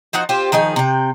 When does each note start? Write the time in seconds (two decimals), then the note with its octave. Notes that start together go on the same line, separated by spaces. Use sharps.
0.13 F3 D#4 F#4 F#5
0.29 C4 F4 G4 C5
0.52 D#3 F3 D#4 G#4
0.76 C3 G5